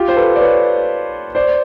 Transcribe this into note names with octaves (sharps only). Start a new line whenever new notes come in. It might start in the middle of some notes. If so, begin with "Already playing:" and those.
Already playing: F4 G4
C5
A4 B4
D5
B4 C#5
C5 D5